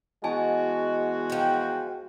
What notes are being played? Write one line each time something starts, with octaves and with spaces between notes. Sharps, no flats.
E2 G#3 F#4 D#5 G#5 A5
F3 G5